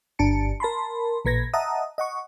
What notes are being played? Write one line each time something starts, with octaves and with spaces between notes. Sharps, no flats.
G1 D4 A5 C#7
A#4 A5 B5 C6
A1 A#2 B4 G#6 A#6
D#5 E5 F#5 A5 A#5 D#6
D#5 F#5 C#6